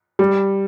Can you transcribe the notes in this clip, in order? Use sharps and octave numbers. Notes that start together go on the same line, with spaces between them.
G3